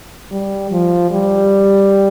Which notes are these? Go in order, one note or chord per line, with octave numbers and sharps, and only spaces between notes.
G3
F3
G3